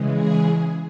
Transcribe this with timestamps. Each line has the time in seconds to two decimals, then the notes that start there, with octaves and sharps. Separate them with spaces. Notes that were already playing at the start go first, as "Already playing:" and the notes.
Already playing: C#3 E3 G#3
0.14 G#4